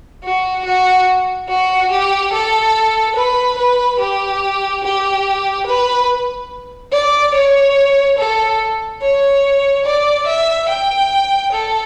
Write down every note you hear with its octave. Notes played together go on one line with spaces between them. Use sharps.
F#4
F#4
F#4
G4
A4
B4
B4
G4
G4
B4
D5
C#5
A4
C#5
D5
E5
G5
A4